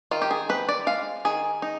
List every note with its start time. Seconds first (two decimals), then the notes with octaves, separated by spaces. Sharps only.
0.11 D#3 F4
0.22 G4
0.31 G#4
0.49 C4 B4
0.69 D5
0.87 G#3 F5
1.25 D#3 G#4
1.62 D#4